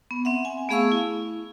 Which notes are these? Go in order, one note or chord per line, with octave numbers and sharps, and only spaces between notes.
B3
C4 E5 F#5
G#5
A3 B3 G#4 F5 C#6 E6
E4